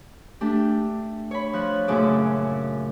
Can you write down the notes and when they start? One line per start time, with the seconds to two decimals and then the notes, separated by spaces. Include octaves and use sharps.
0.41 A3 D4 G4
1.31 C#5 B5
1.53 F3 F#6
1.88 F#2 A#2 C#3 A3 G#4 D6